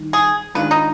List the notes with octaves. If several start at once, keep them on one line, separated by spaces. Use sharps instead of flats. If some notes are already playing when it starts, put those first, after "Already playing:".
Already playing: D#3 G3
G#4
G#2 D#3 G#3 D4 F4 B4
D#4